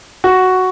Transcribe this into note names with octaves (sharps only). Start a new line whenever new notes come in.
F#4